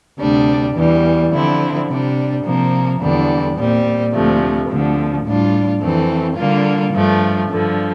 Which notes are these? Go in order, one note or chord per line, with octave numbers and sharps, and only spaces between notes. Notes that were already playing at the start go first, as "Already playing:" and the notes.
D2 C3 G3 D4
E2 E3 G3
D3 F3 C4 E4
C3 G3 D4
C3 F3 A#3
E2 D3 G3
A#2 G3 C4
D2 C3 F3 A3
D2 D3 F3
A2 G3 D4 F4
F2 E3 A3 C4
D3 G3 A#3 F4
G2 F3 A3
G2 D3 F3